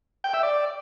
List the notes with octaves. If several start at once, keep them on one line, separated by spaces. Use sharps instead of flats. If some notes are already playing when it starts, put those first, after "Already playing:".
G5
E5
D5